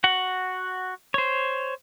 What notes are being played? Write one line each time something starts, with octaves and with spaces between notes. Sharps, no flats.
F#4 F#5
C5 C#5